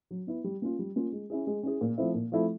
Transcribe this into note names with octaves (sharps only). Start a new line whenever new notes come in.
F#3
B3 E4
G3
A#3 C#4 F4
G3
A#3 C#4 F4
G#3
C#4 E4 G#4
G#3
C#4 E4 G#4
A#2
F3 A3 C4 E4
A#2
F3 A3 C4 E4